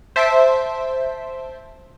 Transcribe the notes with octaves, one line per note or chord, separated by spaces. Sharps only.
C5 E5 A5 C6 B6 D7